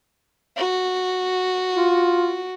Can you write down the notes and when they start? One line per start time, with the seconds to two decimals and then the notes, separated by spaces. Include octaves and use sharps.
0.57 F#4
1.76 F4